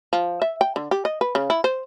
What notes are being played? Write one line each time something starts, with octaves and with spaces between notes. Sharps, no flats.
F3
E5
G5
D3
G4
D#5
B4
C#3
E4
C5